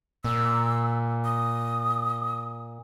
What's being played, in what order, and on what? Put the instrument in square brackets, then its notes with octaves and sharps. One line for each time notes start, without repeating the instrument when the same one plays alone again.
[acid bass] A#2 [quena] E6
[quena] D#6